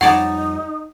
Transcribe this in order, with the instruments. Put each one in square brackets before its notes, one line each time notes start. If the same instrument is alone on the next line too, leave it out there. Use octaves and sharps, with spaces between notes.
[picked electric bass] F2 G3 [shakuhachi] D#4 [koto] C#5 D5 A5 [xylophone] F#5